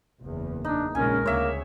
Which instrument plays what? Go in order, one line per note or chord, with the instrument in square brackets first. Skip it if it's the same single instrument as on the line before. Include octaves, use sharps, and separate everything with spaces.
[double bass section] F#1 E2
[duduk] D4 [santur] D#4
[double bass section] A#1 C#3 G#3 [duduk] C#4 [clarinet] A#4 [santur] G#5
[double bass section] D2 C#3 [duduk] A#3 [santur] C#5 E5